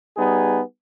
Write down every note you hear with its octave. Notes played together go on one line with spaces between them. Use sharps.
G3 B3 D#4 G#4